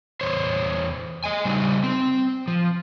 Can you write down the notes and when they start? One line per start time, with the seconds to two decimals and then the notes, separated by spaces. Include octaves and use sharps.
0.21 E2 C5 C#5
1.24 D#5 G#5
1.45 C#3 G3 D4 D#4
1.84 C4
2.48 F3